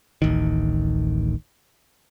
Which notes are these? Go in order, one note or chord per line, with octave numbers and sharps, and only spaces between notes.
D1 A1 D#3